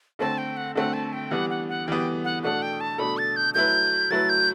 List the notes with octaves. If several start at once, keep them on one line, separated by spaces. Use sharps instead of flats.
D3 A3 C4 A5
G5
F#5
D3 A3 C4 F#5
A5
G5
E3 G3 B3 F#5
F#5
F#5
E3 G3 B3 G5
F#5
B2 A3 D4 A4 F#5
G5
A5
B2 A3 D4 A4 B5
A6
G6
F#3 A3 E4 B4 G6
F#3 A3 E4 B4 A6
G6